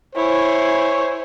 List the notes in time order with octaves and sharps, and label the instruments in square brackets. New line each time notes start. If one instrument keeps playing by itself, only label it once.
[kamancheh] E4 G#5 [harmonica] C5 C#5